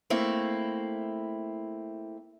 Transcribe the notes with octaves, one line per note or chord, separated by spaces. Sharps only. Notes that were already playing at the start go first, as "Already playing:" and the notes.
A3 A#3 C4 E4